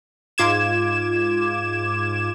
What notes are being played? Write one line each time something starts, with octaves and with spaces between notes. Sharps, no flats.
G#2 F4 D6 G#6 E7